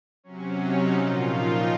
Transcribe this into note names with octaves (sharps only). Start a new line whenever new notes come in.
C3 F#3 C#4
D#4
A#2 F3 F4
D#4